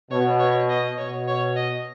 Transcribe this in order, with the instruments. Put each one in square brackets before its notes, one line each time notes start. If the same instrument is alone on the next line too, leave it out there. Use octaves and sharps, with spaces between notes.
[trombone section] B2 [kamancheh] C#5
[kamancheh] C#5
D#5
[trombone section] B2 [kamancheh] C#5
[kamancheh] C#5
D#5